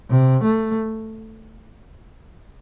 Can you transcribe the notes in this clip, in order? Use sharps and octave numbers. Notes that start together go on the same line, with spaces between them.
C3
A3